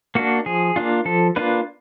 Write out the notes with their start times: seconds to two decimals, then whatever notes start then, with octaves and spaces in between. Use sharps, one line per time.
0.15 A#3 D4 F#4
0.46 F3 G#4
0.76 A#3 D4 F4
1.05 F3 A4
1.36 A#3 D4 F4 B4